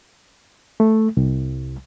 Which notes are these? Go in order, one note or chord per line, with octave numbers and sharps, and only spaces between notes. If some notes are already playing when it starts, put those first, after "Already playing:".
A3
C2